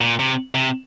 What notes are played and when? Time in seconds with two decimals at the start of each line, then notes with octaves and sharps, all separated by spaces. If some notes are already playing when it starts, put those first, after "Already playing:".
0.01 A#2
0.19 C3
0.55 C3